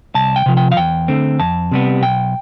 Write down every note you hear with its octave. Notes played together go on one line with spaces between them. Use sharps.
C2 A5
G5
C3 F3
G5
F5
E2 G5
D3 A3 C4
F2 A5
C3 G3 B3
B1 G5